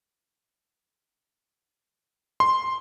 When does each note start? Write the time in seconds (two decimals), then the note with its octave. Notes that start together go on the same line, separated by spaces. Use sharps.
2.40 C6